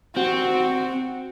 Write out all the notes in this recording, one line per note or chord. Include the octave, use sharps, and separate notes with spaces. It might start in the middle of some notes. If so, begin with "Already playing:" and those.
C4 F#4